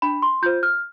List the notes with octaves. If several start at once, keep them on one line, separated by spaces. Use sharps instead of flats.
D4 B5
C6
F4 C5 G6
F6